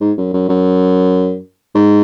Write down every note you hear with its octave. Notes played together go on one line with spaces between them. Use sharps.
G#2
F#2
F#2
F#2
G#2